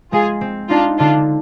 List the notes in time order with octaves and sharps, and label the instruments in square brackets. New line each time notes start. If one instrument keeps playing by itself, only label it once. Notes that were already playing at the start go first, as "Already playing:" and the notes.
[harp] G#3 [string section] F4 G#4
[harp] C4
[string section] D4 F4 [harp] D#4
[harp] D3 [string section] D4 F4